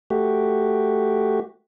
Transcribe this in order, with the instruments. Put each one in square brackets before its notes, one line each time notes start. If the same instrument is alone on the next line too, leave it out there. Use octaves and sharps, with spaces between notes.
[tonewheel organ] A3 F#4 G4